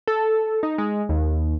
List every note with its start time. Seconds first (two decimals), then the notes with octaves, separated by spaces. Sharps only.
0.08 A4
0.63 D#4
0.78 G#3
1.09 D#2